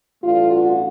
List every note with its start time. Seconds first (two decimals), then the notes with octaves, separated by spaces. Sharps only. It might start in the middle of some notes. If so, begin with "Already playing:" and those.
0.23 A1 G2 E3 A3 D4 F4
0.52 F#4